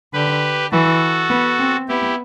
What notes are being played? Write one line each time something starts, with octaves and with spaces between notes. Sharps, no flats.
D3 G4 B4
E3 F#4 A4
B3
C4
B3 E4 G4